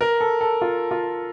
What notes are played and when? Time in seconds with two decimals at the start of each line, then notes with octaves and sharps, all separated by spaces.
0.01 A#4
0.21 A4
0.41 A4
0.61 F4
0.91 F4